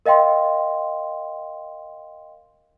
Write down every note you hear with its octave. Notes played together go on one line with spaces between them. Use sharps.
A#4 D#5 F5 G5 C6